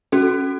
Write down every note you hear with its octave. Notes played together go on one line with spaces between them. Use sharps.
C#4 F#4 A4